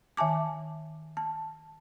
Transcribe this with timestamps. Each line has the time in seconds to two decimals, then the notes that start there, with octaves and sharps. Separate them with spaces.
0.17 D#3 E5 G#5 A5 D6
1.17 A5